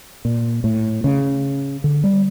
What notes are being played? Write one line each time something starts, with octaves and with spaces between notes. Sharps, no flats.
A#2
A2
C#3
D3
G3